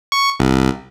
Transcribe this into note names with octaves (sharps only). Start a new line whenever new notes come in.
C#6
C2